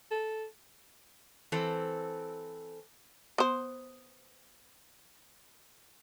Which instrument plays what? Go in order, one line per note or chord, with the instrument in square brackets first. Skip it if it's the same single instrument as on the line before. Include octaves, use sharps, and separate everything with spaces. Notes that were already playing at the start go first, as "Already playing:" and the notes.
[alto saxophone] A4
[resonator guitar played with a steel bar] E3 C4 A4
[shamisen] B3 C5